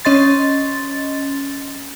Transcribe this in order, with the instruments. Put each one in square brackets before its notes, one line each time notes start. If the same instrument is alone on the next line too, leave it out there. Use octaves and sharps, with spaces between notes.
[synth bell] C#4 D#5 C6 A6